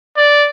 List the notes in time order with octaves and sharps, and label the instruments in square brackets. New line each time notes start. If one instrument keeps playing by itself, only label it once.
[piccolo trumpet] D5